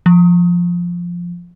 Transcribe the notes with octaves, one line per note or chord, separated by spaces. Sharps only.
F3